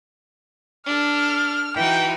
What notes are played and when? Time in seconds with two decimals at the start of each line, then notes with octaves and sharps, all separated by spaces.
0.87 D4 A4 F6
1.76 E3 D#4 F#4 G5